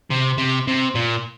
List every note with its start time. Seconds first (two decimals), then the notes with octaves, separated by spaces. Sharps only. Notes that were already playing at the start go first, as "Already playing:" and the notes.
0.11 C3
0.38 C3
0.68 C3
0.95 A#2